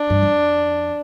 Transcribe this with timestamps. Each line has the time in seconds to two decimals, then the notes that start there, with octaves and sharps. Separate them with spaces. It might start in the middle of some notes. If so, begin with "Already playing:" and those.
Already playing: D4
0.10 G2
0.22 F2